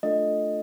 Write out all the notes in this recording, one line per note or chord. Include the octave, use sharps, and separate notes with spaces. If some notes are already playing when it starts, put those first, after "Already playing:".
A3 D4 F4 A4 D#5